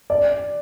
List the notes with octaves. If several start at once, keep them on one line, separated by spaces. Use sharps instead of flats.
D5